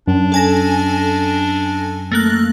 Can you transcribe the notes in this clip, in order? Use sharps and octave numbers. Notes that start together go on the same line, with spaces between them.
F#2 D4
A4 G#5 A#6
A3 A#3 F#6